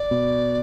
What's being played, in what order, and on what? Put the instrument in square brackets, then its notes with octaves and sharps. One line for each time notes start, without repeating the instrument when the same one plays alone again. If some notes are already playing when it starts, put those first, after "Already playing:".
Already playing: [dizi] D5
[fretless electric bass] B2